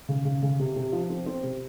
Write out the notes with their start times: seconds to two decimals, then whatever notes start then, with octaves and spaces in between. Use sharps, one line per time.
0.09 C#3
0.25 C#3
0.42 C#3
0.59 C3
0.76 C3
0.92 F3
1.10 C4
1.26 C4
1.43 C3